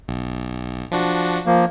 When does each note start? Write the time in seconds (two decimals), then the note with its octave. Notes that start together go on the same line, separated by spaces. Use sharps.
0.08 B1
0.92 F3 D4 F#4
1.46 F3 A#3